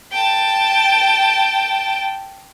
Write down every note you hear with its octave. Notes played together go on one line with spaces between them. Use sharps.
G5 A5